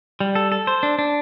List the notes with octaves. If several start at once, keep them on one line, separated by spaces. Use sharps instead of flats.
G3
A4
A4
C5
D4
D4